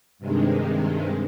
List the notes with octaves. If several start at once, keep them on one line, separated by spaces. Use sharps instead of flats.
G2 C3 D#3 G#3